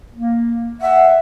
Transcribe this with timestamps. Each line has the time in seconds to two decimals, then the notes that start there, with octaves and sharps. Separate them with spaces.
0.14 A#3
0.82 E5 F#5